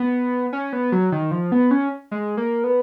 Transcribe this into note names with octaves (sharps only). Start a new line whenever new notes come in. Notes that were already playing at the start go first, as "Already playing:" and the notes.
Already playing: B3
C#4
B3
F#3
D#3
F3
B3
C#4
G#3
A#3
B3